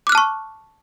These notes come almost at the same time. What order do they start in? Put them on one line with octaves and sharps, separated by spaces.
D6 F#6 F6 A5 C#6